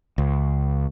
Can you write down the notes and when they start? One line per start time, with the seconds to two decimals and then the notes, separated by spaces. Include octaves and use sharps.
0.18 C#2